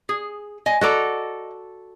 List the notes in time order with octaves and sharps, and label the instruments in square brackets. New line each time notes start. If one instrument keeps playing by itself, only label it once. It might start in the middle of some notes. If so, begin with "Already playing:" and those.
[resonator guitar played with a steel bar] G#4
D#5 G#5
[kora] F#4 A4 D5 [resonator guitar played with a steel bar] D#5 A#5